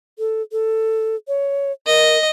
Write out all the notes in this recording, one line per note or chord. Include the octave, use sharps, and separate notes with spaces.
A4
A4
C#5
A#4 D#5